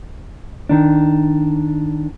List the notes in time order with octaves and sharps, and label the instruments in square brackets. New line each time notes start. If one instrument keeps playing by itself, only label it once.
[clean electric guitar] D#3 D4